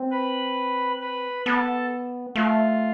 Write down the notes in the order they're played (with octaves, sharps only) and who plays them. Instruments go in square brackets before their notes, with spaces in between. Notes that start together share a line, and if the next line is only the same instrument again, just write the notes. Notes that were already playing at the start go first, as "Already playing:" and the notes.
Already playing: [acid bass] C4
[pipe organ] B4 B5
B4 B5
[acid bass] B3 [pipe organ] A4 A5
[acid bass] A3 [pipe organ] F4 F5